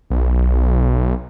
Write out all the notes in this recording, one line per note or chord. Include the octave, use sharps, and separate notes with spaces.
B1